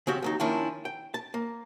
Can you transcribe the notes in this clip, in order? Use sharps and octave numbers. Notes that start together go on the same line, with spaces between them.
C#3 F3 C4 F#4 G4
D#2 F#3 D#4
D#3 F3 A#3 C#4 D4 E4
G5
A5
A#3